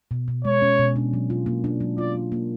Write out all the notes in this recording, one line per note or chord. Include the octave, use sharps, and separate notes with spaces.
B2
B2
G#3 C#5
C#4
B2
D4
F#3
F4
A#3
D4
F#3
F4 D5
A#3
A#3